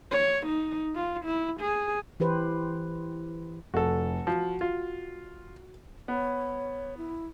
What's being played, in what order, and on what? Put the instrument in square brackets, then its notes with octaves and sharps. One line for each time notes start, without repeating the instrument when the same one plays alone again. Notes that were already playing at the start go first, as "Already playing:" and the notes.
[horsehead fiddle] C#5
D#4
F4
E4
G#4
[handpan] E3 G4 B4 C5
[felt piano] F1 [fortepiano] F#4 A4
[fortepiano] F3 [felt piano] F#4
[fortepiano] F4
[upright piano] B3 [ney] C#5
[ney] E4